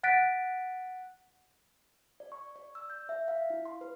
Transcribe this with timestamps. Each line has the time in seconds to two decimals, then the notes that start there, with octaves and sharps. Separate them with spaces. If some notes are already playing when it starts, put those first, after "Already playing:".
0.03 F#5 F#6 A6 B6 D7
2.20 D5
2.32 C#6
2.56 D5
2.75 E6
2.90 G6
3.09 E5
3.28 F5
3.50 E4
3.66 C6
3.81 B4